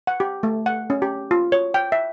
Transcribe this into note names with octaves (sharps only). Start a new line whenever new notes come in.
F#5
G4
A3
F#5
C#4
G4
F4
C#5
G5
E5